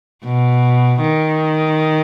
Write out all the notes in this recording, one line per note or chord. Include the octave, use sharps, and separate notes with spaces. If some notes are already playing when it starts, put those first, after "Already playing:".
B2
D#3